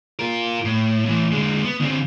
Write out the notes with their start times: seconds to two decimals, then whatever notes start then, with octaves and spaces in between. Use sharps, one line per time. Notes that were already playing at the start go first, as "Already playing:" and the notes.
0.19 F4 A#4
0.65 A2
1.05 A2 E3
1.32 D3 G#3
1.64 B3
1.81 D3 C4